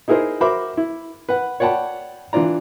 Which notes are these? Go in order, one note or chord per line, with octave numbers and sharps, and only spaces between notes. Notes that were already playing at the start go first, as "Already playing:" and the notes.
D#4 E4 G#4 A#4 C5
F#4 A#4 C5 E5 B5 D6
E4
B4 F#5
C#5 D5 F#5 G5 A5 B5
E3 D4 F4 D5 A#5